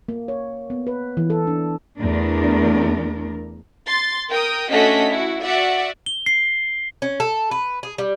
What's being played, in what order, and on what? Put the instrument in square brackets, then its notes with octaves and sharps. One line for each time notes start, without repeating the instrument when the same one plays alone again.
[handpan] A#3
C#5
B3
B4
E3
A4
D4
[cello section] E2 A3 D4 A#4
[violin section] C6 A6
A#4 G5 D#6
A3 C#4 D4 F#4 D#5 B6
E4 F#4
F#4 D5 E5 F#5
[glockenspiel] G7
C7
[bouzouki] C#4
A4
B4
G#4
G3